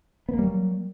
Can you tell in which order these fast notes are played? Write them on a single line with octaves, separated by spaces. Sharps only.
B3 A#3 G3 F#3